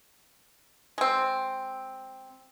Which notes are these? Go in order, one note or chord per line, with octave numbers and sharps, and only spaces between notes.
G#3 C4